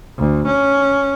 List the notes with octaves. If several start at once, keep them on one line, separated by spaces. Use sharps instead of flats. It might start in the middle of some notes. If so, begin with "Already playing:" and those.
D2
C#4